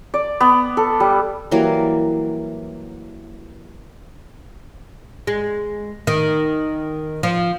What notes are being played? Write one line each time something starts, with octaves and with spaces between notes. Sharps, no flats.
D5
B3
A4
G3
E3 F#3 G3 A#3
G#3
D#3
F3